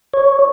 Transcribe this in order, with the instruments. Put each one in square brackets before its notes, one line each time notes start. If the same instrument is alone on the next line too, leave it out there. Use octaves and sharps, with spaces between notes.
[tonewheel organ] C#5